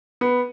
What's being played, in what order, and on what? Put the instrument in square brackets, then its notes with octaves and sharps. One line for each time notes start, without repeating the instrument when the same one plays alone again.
[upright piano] B3